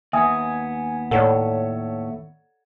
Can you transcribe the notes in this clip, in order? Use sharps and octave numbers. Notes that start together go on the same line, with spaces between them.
D#2 B3 E5 G#5 D#6
A2 A4 C#5 D5 F#5 A#5